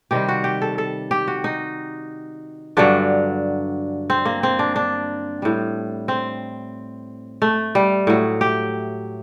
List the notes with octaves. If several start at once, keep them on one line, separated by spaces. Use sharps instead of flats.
C3 D#3 G3 G4
F#4
G4
A4
A4
G4
F#4
D#4
G2 D3 F#3 D4
C4
A#3
C4
D4
D4
A2 G3
C4
A3
G3
A2 F#3
G4